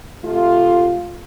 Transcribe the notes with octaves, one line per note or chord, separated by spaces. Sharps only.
C3 A3 F4